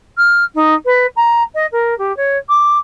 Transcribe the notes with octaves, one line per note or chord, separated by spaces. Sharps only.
F6
D#4
B4
A#5
D#5
A#4
G4
C#5
D6